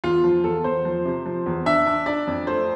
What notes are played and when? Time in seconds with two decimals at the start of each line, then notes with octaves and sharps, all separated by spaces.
0.04 E2 F4
0.24 F3
0.44 E2 A4
0.64 E2 C5
0.85 F3
1.05 C3
1.26 F3
1.46 E2
1.66 D4 E5
1.86 D4
2.06 D4 D5
2.27 F2
2.47 A3 C5